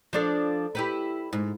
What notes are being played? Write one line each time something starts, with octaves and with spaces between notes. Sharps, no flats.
F3 D4 A4
E4 G4 B4
G#2